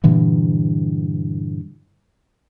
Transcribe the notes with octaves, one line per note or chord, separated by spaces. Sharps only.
G2 A#2 D3 E3